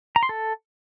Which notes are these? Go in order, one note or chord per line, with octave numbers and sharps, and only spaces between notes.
A#5
C6
A4